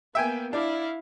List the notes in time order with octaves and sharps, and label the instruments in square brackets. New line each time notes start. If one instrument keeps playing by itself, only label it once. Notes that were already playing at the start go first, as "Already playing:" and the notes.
[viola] A#3 B3 [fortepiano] E5 G5 G#5
[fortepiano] D4 [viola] E4 F5